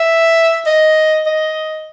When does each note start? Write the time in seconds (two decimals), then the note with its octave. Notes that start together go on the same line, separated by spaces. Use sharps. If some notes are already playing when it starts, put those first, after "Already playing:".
Already playing: E5
0.66 D#5
1.26 D#5